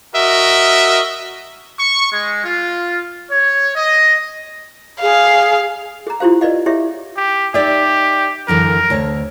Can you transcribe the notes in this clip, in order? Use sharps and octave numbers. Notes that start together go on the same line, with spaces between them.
F#4 A#4 D#5 E5
C#6
G#3
F4
C#5
D#5
G#4 F5
G#4 A#5
E4 F4 G4 C5 F5
B4 D5 D#5 F5
E4 G4 G#4 C#5 E5
G4
D#4 G4 D5 E5
F#2 D3 E3 A#4
D2 C#5 A5